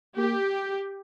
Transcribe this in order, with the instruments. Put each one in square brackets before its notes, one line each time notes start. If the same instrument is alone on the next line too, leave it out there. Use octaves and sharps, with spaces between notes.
[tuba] A#3 [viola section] G4